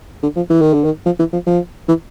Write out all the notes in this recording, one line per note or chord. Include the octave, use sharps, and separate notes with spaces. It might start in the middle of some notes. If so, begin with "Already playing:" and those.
D3
F3
E3
D#3
D3
D#3
F3
E3
F3
F3
E3